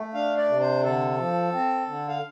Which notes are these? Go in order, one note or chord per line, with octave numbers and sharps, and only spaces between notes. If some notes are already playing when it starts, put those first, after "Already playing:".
Already playing: A3
D4 F5
D5
C3
C5
D3 A4
F3
C4
D3
F5